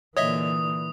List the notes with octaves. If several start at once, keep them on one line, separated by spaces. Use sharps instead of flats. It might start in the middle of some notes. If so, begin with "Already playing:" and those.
A#2 D3 E3 C#5 D#5 E5 D#6